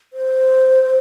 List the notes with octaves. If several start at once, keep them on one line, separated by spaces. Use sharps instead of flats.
C5